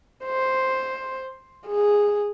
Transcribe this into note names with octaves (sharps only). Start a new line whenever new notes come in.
C5
G#4